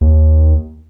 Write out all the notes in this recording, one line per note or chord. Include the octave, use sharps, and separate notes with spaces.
D#2